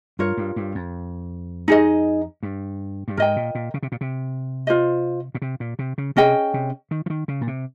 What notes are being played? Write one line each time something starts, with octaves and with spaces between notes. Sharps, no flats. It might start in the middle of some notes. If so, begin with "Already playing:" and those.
G2 F4 A#4 C#5
G2
G2
F2
D#4 G#4 D#5
G2
G2
G#2 A#4 D#5 G5
A#2
A#2
C#3
C3
A#2
C3
F4 C5 D#5
A#2
C3
A#2
C3
C#3
C3 C#4 G#4 D#5 G5
C3
D#3
F3
D#3
C#3
A#2
C3